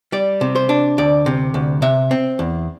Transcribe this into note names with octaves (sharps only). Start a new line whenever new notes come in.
G3 D5
C3
C5
D4
D2 D5
C3
D2
C3 E5
C4
E2